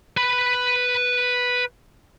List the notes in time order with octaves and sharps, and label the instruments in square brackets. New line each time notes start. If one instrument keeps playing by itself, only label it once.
[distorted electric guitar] B4 B5